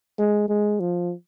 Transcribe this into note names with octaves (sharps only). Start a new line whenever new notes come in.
G#3
G#3
F3